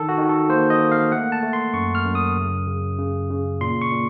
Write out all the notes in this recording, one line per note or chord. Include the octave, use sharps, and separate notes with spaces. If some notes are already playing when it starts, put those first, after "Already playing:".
Already playing: D#3 A4
F#4
D#3
A4
A#3 C5
D#5
A#3
F5
A3 F#5
A5
A3
C6
F#2 C#6
F6
F#2
D#6
C#3
C#3
C#3
C#3
A#2 C6
C#6
A#2